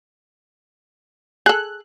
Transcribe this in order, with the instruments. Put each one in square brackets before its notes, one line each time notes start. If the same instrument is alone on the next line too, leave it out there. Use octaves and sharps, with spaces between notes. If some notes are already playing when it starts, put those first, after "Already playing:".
[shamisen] G#4 A4 [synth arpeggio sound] F#6